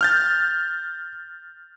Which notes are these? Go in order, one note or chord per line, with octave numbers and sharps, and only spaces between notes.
F6 G6 A6